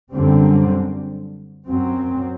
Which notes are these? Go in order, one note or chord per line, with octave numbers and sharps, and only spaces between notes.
F#2 D3 G3 C4
F#2 F#3 C4